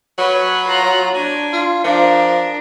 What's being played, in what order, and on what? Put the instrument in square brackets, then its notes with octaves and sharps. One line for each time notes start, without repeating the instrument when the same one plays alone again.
[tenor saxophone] F#3 [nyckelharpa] B4 C#5
[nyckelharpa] F4 A#5
D4 G#5
[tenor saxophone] F4
[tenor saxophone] F3 [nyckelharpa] D4 A#4